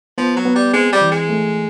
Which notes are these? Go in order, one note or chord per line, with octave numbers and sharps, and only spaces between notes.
F3 B3
F#3
B3
G3
G#3 C4
G3
E3
G#3
A3